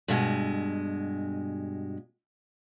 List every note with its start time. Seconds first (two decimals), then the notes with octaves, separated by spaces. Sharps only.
0.08 G2 B2 G#3